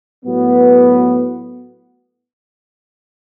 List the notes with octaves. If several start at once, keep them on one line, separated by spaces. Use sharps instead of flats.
A2 F#3 B3